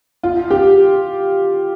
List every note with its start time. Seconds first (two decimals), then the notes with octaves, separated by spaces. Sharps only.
0.23 F4
0.50 G4